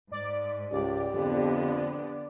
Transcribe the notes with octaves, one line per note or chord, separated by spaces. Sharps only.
G#2 D5
C#2 G4 D5
F2 D3 B3